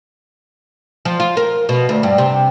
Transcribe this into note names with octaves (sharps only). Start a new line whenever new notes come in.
F3
F4
A#4
B2
D2
G2
C3